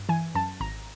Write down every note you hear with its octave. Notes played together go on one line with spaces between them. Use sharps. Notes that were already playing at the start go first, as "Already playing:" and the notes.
Already playing: G2
E3 G#5
F#2 A5
G#1 A#5